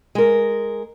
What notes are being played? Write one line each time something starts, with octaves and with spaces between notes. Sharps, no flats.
G#3 A#4